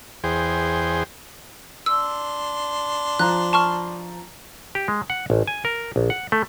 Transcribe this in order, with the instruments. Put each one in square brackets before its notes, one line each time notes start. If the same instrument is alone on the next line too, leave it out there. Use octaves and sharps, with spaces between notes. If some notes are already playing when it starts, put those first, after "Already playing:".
[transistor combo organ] E2 G#4 C5 G5
[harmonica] D4 C6 [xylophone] E6
[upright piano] F3 A#5 [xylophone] F#6
[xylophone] A5 C#6 F6
[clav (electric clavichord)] G4
G#3
F#5
A1
G#5
A#4
A#1
F#5
A3